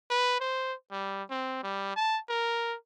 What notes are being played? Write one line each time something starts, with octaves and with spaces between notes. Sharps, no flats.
B4
C5
G3
C4
G3
A5
A#4